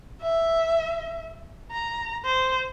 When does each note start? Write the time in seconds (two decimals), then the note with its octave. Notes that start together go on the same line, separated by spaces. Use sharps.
0.22 E5
1.72 A#5
2.25 C5